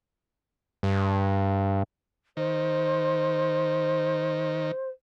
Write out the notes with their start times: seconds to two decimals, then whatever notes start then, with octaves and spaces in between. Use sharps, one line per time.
0.83 G2
2.37 D#3 C5